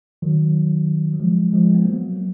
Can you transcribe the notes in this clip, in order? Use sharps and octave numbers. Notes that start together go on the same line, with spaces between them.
D#3 F#3
F#3
F3 G#3
F3 G#3
B3
F#3 A#3